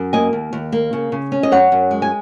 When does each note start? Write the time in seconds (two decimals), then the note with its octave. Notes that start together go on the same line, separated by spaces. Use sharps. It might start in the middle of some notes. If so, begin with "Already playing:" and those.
Already playing: F#2
0.13 A#3 D#5 G#5
0.33 D#2
0.53 D#2
0.72 A#3
0.93 C#3
1.12 C#3
1.32 C#4
1.43 D#5
1.51 F#2 C#5 F#5
1.72 F#2
1.91 G#3
2.02 G#5